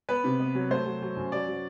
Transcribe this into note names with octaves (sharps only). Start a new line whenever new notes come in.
B3 B4
C3
B3
F#3
A3 C5
F#3
F#3
F#2
F#3 D5
F#3